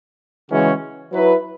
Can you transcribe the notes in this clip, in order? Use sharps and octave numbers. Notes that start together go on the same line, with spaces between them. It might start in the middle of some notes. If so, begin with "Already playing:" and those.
C#3 E3 G#3 C#4 F#4
F#3 E4 B4